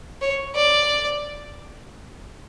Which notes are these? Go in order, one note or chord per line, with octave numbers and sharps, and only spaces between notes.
C#5
D5